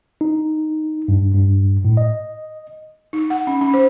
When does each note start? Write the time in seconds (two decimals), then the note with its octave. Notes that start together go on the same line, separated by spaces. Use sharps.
0.21 D#4
1.08 G2
1.34 G2
1.85 A2
1.97 D#5
3.13 D#4
3.30 F#5
3.47 C#4
3.61 C#4
3.74 C5